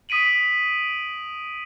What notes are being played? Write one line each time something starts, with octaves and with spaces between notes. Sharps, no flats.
D#6 B6 D7 D#7 F#7